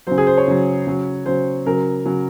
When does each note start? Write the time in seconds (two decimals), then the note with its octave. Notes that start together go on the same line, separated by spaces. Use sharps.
0.07 C#3 F#3 C5
0.18 G#4
0.27 C5
0.37 C#5
0.48 C#3 F#3
0.87 C#3 F#3
1.26 C#3 F#3 C5
1.66 C#3 F#3 A#4
2.05 C#3 F#3